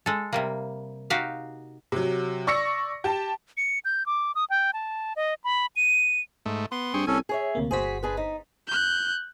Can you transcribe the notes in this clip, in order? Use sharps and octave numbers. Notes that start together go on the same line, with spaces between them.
G#3 A4
C3 G3 A#3
D#4 F#4 G4 F5
C3 F#3
D5 C#6 E6 A#6 C#7
G4 A5
C#7
G6
D6
D#6
G5
A5
D#5
B5
D#7
G#2 A3
B3 C6
G2 C4 G#4 C#6
C2 C#4 A4 G#5
G#4 C#5 E5
D2 C3 A#3
G1 F#4 G#4 C5 B6
D4 G#4 B4
D#4
F#6 G6